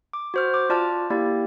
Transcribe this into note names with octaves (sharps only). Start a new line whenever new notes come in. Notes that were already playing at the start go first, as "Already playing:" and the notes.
D6
F#4 C5 F6
D6
F4 D5 A5 F6
A#3 E4 G4 D5